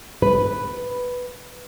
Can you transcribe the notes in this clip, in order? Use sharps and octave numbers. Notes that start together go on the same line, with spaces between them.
B4